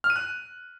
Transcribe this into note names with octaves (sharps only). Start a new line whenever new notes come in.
F6
D#7
F#6